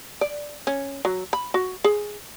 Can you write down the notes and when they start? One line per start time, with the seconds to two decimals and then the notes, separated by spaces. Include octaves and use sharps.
0.21 D5
0.67 C#4
1.05 F#3
1.33 B5
1.54 F#4
1.84 G#4